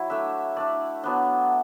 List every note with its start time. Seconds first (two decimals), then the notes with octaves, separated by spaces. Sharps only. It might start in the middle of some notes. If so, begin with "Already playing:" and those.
Already playing: F#3 E4
0.10 A3 D4 E5
0.57 A3 D4 D5
1.04 F#3 B3 D4